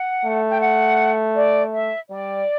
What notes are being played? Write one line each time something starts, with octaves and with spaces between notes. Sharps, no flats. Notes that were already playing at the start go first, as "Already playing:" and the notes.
Already playing: F#5
A3
G5
F#5
D5
E5
G3 D5